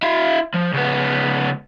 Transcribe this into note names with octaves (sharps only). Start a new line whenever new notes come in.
E4 F5
F3
C#2 B3